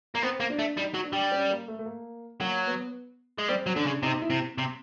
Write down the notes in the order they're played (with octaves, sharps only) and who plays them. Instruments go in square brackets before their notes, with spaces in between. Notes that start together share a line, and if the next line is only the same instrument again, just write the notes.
[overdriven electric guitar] A#3
[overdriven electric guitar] B3 [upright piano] C4
[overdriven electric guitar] A#3
[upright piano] D4
[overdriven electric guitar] A3
[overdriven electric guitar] G3 [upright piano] D#4
[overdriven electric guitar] F#3
[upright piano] D4
[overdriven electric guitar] G3
[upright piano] C#4
A#3
A3
A3
A#3
[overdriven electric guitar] F#3 [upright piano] A#3
[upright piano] B3
[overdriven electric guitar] G#3
[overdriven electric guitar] G3 [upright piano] C4
[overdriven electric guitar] F#3
[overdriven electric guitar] D3 [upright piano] D4
[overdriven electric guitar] C#3
[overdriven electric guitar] C3 [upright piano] D#4
[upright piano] E4
[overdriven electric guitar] C3
C3